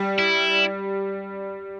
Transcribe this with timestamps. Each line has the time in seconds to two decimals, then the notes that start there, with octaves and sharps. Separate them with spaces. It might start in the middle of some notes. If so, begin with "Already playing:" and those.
Already playing: G3
0.19 E4